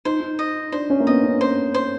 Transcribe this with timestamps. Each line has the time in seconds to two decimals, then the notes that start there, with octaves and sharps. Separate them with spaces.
0.05 D#4 C5
0.20 D#4
0.39 D#5
0.72 D4 C5
0.90 C#4
1.00 A#3
1.07 B3 D#5
1.24 C#4
1.41 C5
1.74 C5